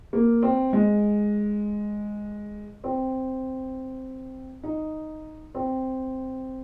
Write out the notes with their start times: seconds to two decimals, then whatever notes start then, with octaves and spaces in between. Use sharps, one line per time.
0.13 A#3
0.43 C4
0.73 G#3
2.84 C4
4.63 D#4
5.55 C4